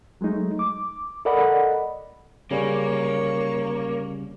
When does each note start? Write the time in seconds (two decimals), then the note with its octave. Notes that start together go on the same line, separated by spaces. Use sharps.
0.21 F#3 G#3 A3 D#4
0.59 D6
1.25 A4 A#4 D5 D#5 F#5 B5
2.51 C#3 G3 A#3 C#4 C#5